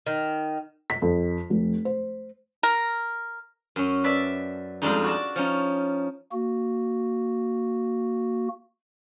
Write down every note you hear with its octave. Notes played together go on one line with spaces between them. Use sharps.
D#3
B6
F2
F1
C5
A#4
F#2 C#4
B4 D5 E5 A5
F2 G3 G#3 D4 D#4
F#4 D5 A5
F3 C#4 D#4
A#3 F#4